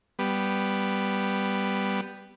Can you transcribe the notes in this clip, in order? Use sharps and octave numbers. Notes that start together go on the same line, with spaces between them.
G3 B3